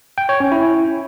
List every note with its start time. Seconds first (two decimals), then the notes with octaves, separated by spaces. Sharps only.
0.18 G5
0.29 C#5
0.40 C#4
0.52 E4